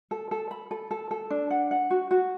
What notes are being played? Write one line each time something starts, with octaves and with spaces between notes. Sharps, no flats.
A4
A4
B5
A4
A4
A4
D4
F#5
F#5
F#4
F#4